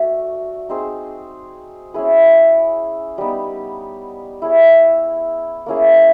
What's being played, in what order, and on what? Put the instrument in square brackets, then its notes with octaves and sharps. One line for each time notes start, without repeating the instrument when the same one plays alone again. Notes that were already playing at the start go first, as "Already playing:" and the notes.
Already playing: [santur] A3 D4 F#4
C4 D#4 G#4 C5
C#4 E4 G#4 B4
G3 B3 D#4
E4 G#4 C#5
A#3 C#4 E4 G#4